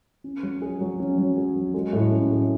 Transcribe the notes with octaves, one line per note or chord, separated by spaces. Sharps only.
C#4
F#3
G#4
F#3
C#4
F#3
G#4
F#3
G#3
A2
C#4
G#4